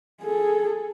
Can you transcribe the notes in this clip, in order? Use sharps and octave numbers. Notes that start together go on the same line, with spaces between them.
G#4 A4